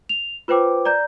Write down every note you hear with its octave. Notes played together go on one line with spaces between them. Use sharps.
F7
F4 B4 C5 G5 D6
D5 A#5 G6